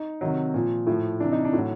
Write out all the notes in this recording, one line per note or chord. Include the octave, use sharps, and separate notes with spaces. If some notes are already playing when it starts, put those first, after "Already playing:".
Already playing: D#4
C3 D#3 F#3
A#2 F3
A2 F3
C3 E3 D4
D#4
D4
A2 F#3